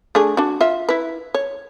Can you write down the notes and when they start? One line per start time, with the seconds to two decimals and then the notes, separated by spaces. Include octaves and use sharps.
0.15 A3 D4 G#4
0.37 D4 F#4
0.61 F4 E5
0.89 E4 B4
1.34 C#5